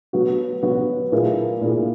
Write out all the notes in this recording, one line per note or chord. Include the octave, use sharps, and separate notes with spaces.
F#3 B3 F#4
F#3 B3 F#4
A#2 A#3 E4 G#4
A#2 A#3 E4 G#4